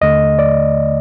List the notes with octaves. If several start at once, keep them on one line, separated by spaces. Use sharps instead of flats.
D#2 D3 A3 D#5
D5